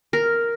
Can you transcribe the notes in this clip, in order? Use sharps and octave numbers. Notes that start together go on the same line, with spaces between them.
A#4